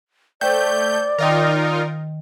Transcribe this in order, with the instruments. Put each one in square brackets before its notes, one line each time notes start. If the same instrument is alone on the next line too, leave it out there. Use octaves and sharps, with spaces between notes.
[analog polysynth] A3 G6 [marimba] C5 G5 [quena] D5
[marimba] D#3 D#5 G5 [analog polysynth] D#4 F4 A#4